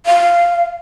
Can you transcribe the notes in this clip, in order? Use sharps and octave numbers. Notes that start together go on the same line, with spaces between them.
F5